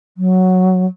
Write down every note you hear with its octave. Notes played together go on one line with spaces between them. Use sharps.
F#3